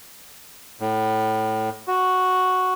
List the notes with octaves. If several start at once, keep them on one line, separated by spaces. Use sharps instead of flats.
A2
F#4